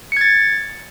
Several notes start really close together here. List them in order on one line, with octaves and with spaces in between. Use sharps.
C#7 G#6 A6